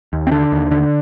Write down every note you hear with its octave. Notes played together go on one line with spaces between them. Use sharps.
D#2
C4
D3 D4
D#2
D3